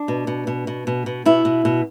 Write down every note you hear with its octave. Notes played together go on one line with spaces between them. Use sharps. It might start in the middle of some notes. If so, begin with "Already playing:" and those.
Already playing: D4
B2
B2
B2
B2
B2
B2
B2 E4
B2
B2